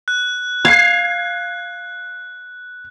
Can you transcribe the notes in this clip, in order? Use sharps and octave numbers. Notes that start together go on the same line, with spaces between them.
F#6
F5 G#6 C7